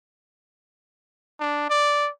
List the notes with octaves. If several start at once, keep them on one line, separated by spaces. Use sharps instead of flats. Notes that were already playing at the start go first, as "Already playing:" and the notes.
D4
D5